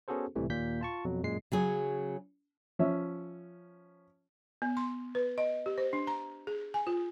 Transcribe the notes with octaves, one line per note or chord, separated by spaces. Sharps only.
B3 C#4 F#4 G#4 A4 C5
C#2 A2 C3 E3 G3 A3
D#2 A#2 A#3 G6 B6
F4 A5 C#6
F2 B2 F#3
F#2 A#2 G#3 C7
C#3 F#3 G#4
F3 C#4 E5
B3
C6
B4
D#5
G4
C5
D4
A#5
G#4
G#5
F4